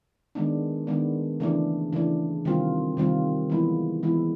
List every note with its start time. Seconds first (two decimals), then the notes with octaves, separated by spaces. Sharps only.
0.35 D#3 G#3 B3 D4
0.87 D#3 G#3 B3 D4
1.40 C#3 E3 A3 D4
1.93 C#3 E3 A3 D4
2.45 C3 D#3 G3 C4 F4
2.97 C3 D#3 G3 C4 F4
3.50 E3 G#3 B3 E4
4.03 E3 G#3 B3 E4